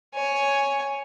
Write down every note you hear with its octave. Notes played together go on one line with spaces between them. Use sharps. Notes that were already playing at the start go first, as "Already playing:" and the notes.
C#5 G#5